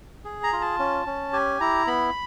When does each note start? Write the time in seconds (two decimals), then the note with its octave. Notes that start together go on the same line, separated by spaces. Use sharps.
0.25 G#4
0.43 A#5
0.53 F4
0.62 A5
0.79 C#4
1.06 C#4
1.33 G4 G#5
1.61 E4 A#5
1.87 B3 B5